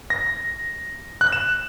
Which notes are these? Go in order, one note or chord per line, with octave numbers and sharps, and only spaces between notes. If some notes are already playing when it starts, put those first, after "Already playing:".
A#6
F#6
E7